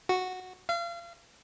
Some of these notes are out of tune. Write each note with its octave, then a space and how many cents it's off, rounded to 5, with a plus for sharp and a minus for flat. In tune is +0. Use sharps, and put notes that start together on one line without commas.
F#4 -5
F5 -35